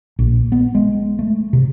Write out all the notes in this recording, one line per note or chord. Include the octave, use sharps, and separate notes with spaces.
A#1
B3
G#3
A3
C3